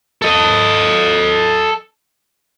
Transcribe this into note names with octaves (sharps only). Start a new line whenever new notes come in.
A4 D#5